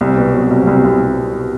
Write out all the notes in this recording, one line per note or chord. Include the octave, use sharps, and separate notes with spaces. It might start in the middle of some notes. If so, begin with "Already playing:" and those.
C2
B2
F#3
C2
C2
C2